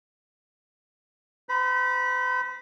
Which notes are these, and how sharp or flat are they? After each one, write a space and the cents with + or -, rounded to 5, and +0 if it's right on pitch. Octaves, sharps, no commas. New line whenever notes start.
C5 -45 B5 -25